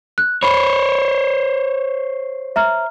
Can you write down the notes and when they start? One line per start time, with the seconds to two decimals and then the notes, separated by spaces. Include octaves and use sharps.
0.18 F#6
0.43 C5 C#5 B5
2.56 E5 A#5 F6